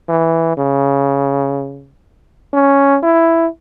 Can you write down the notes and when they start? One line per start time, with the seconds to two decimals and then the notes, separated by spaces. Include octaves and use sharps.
0.09 E3
0.57 C#3
2.53 C#4
3.03 E4